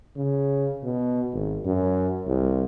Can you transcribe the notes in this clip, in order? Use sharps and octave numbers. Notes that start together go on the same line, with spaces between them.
C#3
B2
G#1
F#2
C2